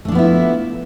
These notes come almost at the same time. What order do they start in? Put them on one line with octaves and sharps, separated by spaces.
A3 D4 F3 B3 E4